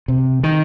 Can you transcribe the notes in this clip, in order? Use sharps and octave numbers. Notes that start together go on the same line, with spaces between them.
C3
D#3